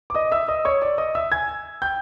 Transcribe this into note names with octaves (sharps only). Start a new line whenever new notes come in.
D6
D#5 D#6
E5 E6
D#5 D#6
C#5 C#6
D5 D6
D#5 D#6
E5 E6
G#5 G#6
G5 G6